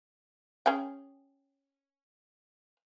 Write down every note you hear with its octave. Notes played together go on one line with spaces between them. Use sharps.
C#4 G#4 G5